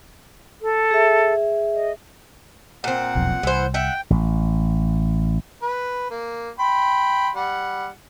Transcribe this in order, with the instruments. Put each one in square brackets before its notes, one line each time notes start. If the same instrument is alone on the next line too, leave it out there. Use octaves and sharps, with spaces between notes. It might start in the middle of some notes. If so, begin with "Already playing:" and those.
[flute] A4
[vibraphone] G#4 E5
[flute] D#5
[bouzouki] A#2 C4 [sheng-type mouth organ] F#5
[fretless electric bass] E1 B1 F2
[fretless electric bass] C2 [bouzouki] E3 C5
[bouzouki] E5 F#5 [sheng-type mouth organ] G5
[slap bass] A1
[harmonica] B4
A#3
G5 B5 C6
G3 F#5